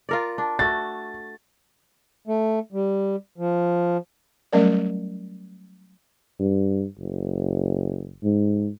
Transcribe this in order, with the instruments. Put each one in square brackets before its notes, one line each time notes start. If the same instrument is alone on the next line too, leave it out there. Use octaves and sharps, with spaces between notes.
[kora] F4 A#4 D5
D4
[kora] A3 F#4 [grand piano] A6
[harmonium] A3
G3
F3
[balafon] F#3 G3 A3 C#4 A#4 D5
[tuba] G2
F#1
G#2